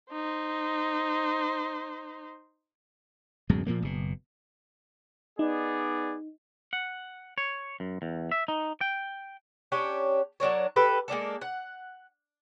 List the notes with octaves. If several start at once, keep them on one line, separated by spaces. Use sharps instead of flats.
D#4 C5
D1 F#2 B2 G#3
A#2 F3 A#3
F#1 B2
B3 D#4 G#4 D5
F#5
C#5
F#2
E2
E5
D#4
G5
C#4 D4 G4 C#5
F#3 D4 A#4 C#5
G4 A4 B4
G#3 A#3 D4 A4
F#5